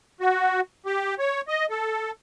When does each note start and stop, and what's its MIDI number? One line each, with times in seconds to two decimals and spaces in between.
0.21 0.60 66
0.86 1.15 67
1.19 1.41 73
1.48 1.66 75
1.70 2.11 69